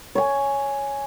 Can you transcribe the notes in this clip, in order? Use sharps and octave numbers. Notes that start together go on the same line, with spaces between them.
C#5 G#5